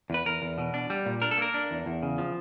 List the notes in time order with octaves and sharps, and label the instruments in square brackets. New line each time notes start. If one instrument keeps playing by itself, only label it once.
[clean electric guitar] E2 B4
E2 A#4
E2
B2
D4
G3
A#2
D4 A#4
A4
A#3 A#4
D4
E2
E2
C#3
F3